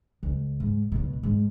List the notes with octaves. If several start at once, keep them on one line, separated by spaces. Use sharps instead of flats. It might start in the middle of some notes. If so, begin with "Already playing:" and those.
C#2
G#2
C#2 B2
G#2